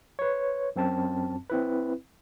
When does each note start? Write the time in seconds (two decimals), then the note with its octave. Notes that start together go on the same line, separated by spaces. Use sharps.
0.19 B4 C#5
0.76 F#2 C4 A5
1.50 C4 E4 B4